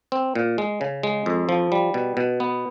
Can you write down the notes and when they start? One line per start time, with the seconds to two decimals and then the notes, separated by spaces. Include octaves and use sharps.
0.12 C4
0.35 A#2
0.58 G#3
0.81 C#3
1.03 G#3
1.26 F2
1.49 F3
1.72 G3
1.94 B2
2.17 B2
2.40 B3